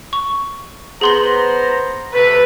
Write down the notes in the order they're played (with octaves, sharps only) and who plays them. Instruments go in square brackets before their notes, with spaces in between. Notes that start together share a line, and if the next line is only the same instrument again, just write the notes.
[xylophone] C#6
[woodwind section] B3 C5 A#5 [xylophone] G#4 C6 F#7
[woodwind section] C3 A3 [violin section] B4